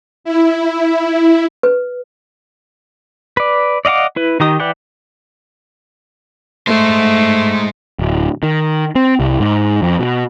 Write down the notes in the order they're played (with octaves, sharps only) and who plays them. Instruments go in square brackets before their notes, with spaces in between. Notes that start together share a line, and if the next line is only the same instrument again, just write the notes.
[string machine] E4
[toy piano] B4
[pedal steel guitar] B4 D5
D5 D#5 F5 F#5 D6
E4 B4
D#3 D#4 G4 D#6
E3 B4 D5 F#5 G5
[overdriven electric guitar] G#3 C5 [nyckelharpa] A3
[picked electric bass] D1
D#3
C4
C2
G#2
F2
B2